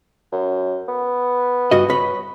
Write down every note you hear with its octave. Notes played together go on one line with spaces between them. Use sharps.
F#2
B3
G2 F#4 D#5
B4 C#5 B5